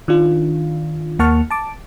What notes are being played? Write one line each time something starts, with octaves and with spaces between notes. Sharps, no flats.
D#3 D4 F4
D#2 A#3 F#5 A5 C#6 F6
A5 D6